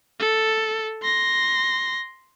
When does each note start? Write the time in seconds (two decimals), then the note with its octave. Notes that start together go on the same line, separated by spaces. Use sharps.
0.20 A4
1.02 C6 A#6